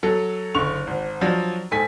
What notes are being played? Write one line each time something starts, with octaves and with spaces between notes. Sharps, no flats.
F#3 A4
F#1 D3 C#6 F7
G#1
F3 F#3 D4
G#2 A4 G#5 B6